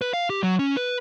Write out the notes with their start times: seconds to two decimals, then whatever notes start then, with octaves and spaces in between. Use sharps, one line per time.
0.01 B4
0.13 F5
0.30 G4
0.43 F#3
0.59 C#4
0.77 B4